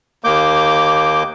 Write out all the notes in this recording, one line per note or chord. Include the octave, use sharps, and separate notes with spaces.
D#2 A#3 D6 G6